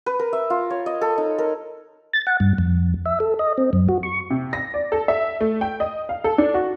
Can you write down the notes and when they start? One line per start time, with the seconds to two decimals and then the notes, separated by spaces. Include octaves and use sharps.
0.06 B4
0.19 A#4
0.33 E5
0.50 F4
0.70 C#5
0.86 D#5
1.01 A4
1.18 D#4
1.38 A#4
2.13 A6
2.27 F#5
2.40 G2
2.58 F2
3.06 E5
3.20 A4
3.39 D#5
3.58 C4
3.73 F#2
3.89 F#4
4.03 C#6
4.30 C3
4.53 A#6
4.74 D5
4.92 A4
5.08 E5
5.41 A3
5.61 G5
5.80 D#5
6.09 F5
6.24 A4
6.38 D4
6.54 F#4